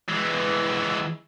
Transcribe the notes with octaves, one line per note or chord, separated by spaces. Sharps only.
E3 G#3